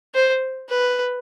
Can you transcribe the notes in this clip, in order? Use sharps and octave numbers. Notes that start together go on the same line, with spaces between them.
C5
B4